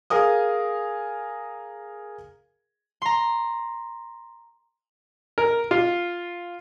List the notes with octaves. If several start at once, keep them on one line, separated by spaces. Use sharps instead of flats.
G#4 A#4 F5 D#6
A#5 C6
A#4
F4